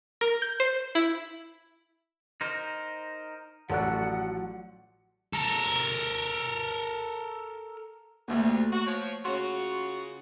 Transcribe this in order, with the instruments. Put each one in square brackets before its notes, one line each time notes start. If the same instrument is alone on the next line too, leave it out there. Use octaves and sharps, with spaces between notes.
[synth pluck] A#4
G6
C5
E4
[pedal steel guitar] D#4 A#4 C5
[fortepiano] A1 A4 D5 [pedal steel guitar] F3 F#3 F#6 [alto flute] F#5
[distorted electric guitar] A4 A#4
[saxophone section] D2 C3 [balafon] A3 A#3
[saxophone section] F#4
F3 C#5
[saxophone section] C#3 F4 F#4 [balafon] C#5 C6